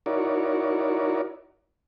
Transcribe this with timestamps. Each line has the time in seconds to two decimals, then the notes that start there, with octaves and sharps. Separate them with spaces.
0.06 D#4 E4 F#4 A#4 C#5 D5